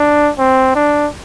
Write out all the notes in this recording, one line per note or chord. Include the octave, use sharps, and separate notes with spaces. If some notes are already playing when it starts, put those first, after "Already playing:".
Already playing: D4
C4
D4